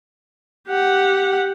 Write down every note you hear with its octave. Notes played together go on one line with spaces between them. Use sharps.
G4 F#5